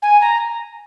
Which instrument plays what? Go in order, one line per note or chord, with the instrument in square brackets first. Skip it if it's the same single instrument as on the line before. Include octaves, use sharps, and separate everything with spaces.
[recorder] G#5
A#5